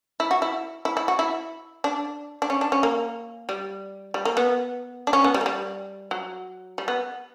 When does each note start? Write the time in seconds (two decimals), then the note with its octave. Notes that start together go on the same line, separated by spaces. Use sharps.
0.20 E4
0.31 F#4
0.42 E4
0.85 E4
0.97 E4
1.08 F#4
1.19 E4
1.84 D4
2.42 D4
2.50 C#4
2.61 D4
2.72 C#4
2.83 A#3
3.49 G3
4.14 G3
4.25 A#3
4.37 B3
5.07 D4
5.13 C#4
5.24 B3
5.34 G3
5.41 A#3
5.46 G3
6.11 F#3
6.78 G3
6.88 B3